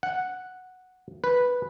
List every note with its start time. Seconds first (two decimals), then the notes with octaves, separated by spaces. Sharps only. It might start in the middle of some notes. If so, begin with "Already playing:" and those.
0.03 F#5
1.24 B4